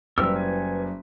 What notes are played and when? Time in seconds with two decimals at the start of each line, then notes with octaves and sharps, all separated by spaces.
0.18 F#1 G3 A#4 B4 E6 F6
0.36 G#5